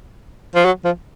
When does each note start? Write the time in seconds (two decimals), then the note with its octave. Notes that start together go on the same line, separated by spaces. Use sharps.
0.55 F3
0.65 F#3
0.85 F3